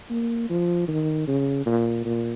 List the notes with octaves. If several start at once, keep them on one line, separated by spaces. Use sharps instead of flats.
A#3
F3
D#3
C#3
A#2
A#2